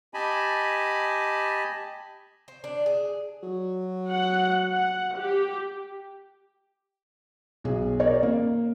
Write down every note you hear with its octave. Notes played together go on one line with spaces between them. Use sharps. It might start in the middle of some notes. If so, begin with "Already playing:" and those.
G4 D#5 G#5 A5 B5
C5
D4
G#4
F#3
F#5
F#5
G4
B1 G#4
A#4 C#5 D5
A#3